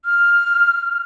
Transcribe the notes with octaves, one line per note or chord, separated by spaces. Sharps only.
F6